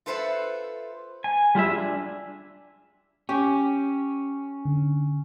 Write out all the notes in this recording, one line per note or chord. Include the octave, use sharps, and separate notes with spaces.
F4 A4 B4 C5 E5 F#5
G#5
G3 F4 G#4 E5
D4
C#4 G4
D3